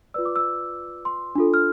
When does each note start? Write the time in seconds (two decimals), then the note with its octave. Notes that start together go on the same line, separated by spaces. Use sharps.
0.14 F4 B4 D5 E6
0.25 D6
0.36 E6
1.05 C6
1.35 D4 F4 A4
1.54 F6